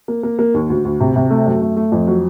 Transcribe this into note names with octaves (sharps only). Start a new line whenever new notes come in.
A#3
A#3
A#3
D#2
D2
D2
C3
C3
A3
F#2
A3
A3
F2
F#3